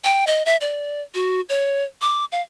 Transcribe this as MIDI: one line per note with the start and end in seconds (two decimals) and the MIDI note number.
0.04 0.25 79
0.27 0.45 75
0.46 0.57 76
0.61 1.02 74
1.14 1.41 66
1.49 1.84 73
2.01 2.25 86
2.32 2.42 77